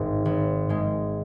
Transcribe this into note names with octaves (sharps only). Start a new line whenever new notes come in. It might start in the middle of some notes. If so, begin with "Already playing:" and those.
Already playing: G#1 G#2 G#3
G#1
G#2 G#3